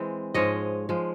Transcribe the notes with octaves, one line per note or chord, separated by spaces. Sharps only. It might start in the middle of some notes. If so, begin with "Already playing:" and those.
Already playing: E3 G#3 C4
G#2 F3 G#3 C#5 D#5
F3 G#3